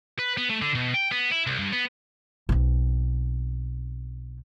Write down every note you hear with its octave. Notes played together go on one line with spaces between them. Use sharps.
B4
B3
A3
D3
B2
G5
B3
E4
C2
G2
B3
B1 C4